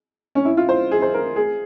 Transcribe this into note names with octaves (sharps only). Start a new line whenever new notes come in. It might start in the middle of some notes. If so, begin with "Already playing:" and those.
C#4
E4
F4
C5
G#4
C5
A#4
G#4